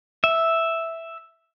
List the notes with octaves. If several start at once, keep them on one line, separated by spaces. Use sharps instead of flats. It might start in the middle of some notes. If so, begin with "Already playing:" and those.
E5